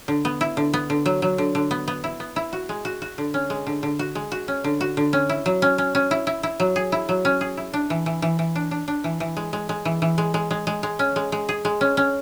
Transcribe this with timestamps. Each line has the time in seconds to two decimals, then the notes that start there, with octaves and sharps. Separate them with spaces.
0.08 D3
0.25 B3
0.41 E4
0.57 D3
0.73 B3
0.90 D3
1.06 F#3
1.22 F#3
1.38 D3
1.55 D3
1.71 B3
1.88 B3
2.04 E4
2.20 B3
2.36 E4
2.53 F#4
2.69 G#3
2.85 F#4
3.02 F#4
3.18 D3
3.34 C#4
3.50 G#3
3.67 D3
3.83 D3
3.99 F#4
4.15 G#3
4.32 F#4
4.48 C#4
4.64 D3
4.81 F#4
4.97 D3
5.13 C#4
5.29 E4
5.46 F#3
5.62 C#4
5.78 C#4
5.95 C#4
6.11 E4
6.27 E4
6.43 E4
6.60 F#3
6.76 G#4
6.92 E4
7.09 F#3
7.25 C#4
7.41 G#4
7.57 E4
7.73 D4
7.90 E3
8.06 E3
8.22 E3
8.39 E3
8.55 D4
8.71 D4
8.88 D4
9.04 E3
9.20 E3
9.37 G#3
9.53 G#3
9.69 G#3
9.85 E3
10.02 E3
10.18 G#3
10.34 G#3
10.51 G#3
10.67 G#3
10.83 G#3
10.99 C#4
11.16 G#3
11.32 G#3
11.49 G#4
11.65 G#3
11.81 C#4
11.97 C#4